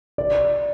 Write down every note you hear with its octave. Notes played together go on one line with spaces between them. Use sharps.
D5